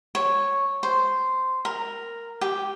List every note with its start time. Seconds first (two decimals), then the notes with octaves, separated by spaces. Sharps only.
0.15 C#5
0.83 C5
1.65 A#4
2.41 G4